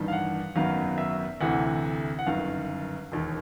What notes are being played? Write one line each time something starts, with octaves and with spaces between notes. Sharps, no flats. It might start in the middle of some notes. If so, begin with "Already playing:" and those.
Already playing: A1 G2 D#3
F5
F#5
G#1 F#2 D#3 F#3 B3 F5
E5
D2 C3 E3 A3 F#5
F#5
G1 F#2 D#3 F5
E1 D#2 D#3